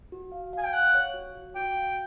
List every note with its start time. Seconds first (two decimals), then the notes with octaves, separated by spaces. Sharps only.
0.12 F#4
0.32 F5
0.53 F5 G#5
0.65 G5
0.73 F5 F#5
0.94 C#5
1.14 F#4
1.35 F#4
1.56 F#4 G5
1.76 F5